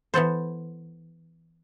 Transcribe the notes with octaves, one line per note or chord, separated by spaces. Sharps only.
E3 B3 A4 C5